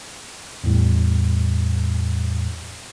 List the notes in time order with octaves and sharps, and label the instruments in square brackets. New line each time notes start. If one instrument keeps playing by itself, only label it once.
[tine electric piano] E2 A2 G3